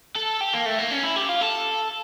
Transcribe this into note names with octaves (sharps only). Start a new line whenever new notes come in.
A4
G4
A#3
A3
A#3
C#4
E4
G4
F4
A4